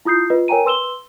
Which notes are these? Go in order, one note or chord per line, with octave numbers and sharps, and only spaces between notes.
E4 F4 D#6 G6 C7
F4 B4 D#5
A#4 C#5 G5 G#5 A#5 D#7
B4 C6 E6 E7 G7